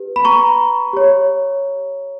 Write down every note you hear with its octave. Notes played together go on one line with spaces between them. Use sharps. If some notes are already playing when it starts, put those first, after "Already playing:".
Already playing: G4 B4
B5
A#5 C#6
G4 C#5